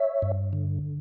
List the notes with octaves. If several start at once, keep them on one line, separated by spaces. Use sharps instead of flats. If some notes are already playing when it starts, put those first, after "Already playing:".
Already playing: C#5 E5
G2
D3